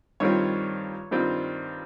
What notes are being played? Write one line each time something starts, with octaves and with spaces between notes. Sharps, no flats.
G2 D#3 G3 C4 F4 C#5
G2 D#3 G3 C4 F4